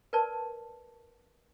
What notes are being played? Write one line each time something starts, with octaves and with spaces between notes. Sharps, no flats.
A#4 B4 D5 A5